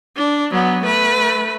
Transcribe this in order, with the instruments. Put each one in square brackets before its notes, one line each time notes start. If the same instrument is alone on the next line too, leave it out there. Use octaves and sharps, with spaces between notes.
[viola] D4
F#3 B3
A3 B4